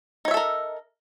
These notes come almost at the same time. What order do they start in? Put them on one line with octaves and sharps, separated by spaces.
D#4 C#5 E5 A4 A#4